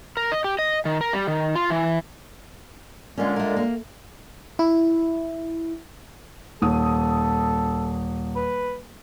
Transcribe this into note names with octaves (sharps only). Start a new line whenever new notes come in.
A#4
D#5
G4
D#5
D#3
A#4
G3
D#3
F4
E3
A#2 D3 G#3 C#4 F4
A3 A#4
A#3
E4
D#1 A4 D#6
B4